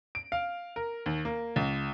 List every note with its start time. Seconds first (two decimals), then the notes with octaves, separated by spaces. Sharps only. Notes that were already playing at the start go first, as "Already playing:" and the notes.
0.15 D7
0.32 F5
0.76 A#4
1.06 D#2
1.25 A#3
1.56 C#2